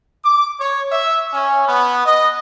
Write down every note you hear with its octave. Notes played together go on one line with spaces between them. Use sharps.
D6
C#5
E5
C#4
B3
D#5